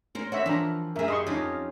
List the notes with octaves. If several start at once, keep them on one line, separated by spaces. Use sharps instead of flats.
C#4 A#4 C5 C#6
F#4 A#4 C#5 E5
E3 F3 D4 A#5
F#2 G#4 A#4 E5
G4 D#5 C6 C#6
F2 C#4 D#4 F4